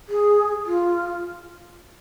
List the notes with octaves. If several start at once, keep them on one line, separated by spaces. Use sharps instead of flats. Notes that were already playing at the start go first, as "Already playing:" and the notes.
G#4
F4